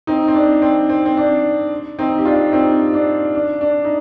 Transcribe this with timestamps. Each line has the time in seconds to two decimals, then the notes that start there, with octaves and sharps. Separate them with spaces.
0.07 C4 D#4
0.28 C4
0.35 D4
0.62 C4
0.89 C4
1.06 C4
1.17 D4
1.99 C4 D#4
2.18 G4
2.25 D4 F4
2.52 C4 D#4
2.93 D4
3.35 D4
3.61 D4
3.85 D#4